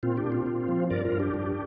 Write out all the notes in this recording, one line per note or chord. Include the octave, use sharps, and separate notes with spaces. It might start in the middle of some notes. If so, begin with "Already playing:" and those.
A#2 C4 F4
D4 G4
A#2
C4 F4
A#2
F3
G2 A#4 D5
F4 A#4
G2
D4 G4
G2